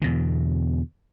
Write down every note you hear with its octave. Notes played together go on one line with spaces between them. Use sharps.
E2 B2 D3